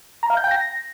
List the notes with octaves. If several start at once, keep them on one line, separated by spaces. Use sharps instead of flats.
A#5
F5
G6
G5
A#6